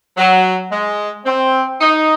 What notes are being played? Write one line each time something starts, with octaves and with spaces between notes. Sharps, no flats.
F#3
G#3
C4
D#4